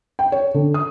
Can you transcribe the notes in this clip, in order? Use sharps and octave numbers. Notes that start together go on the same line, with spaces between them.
G5
C#5
D3
D#6